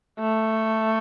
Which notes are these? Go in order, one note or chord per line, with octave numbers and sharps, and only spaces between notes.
A3